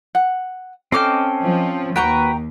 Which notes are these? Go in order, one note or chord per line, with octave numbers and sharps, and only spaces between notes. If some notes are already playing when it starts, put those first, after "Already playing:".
F#5
C4 C#4 A4 D#5 G5 D6 F6
F3
D#2 F#4 B4 G5 A#5 C#6